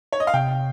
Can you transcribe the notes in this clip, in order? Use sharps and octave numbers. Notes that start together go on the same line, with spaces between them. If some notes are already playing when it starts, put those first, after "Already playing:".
C#5
D#5
F5
C3 G5